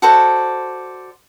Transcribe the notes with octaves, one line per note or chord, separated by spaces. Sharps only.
F#4 A4 C5 D5